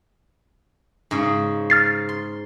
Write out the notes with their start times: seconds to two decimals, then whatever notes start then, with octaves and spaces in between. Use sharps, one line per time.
1.11 G#2 C#3
1.70 F6 A6 C7
2.09 C6